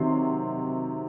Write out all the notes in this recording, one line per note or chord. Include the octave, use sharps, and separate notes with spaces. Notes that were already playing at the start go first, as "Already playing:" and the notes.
Already playing: C3 D#3 F#3 C6